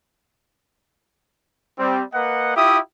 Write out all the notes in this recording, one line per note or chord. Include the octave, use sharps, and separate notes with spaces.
G3 C4
A#3 B4 D#5 F#5
E4 F4 G4 E5 D#6